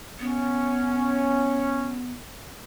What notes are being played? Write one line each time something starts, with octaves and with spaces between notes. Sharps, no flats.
B3 C#4